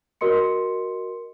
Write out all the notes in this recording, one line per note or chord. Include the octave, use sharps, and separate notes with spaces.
F#4 A#4 D#5 C6 C#7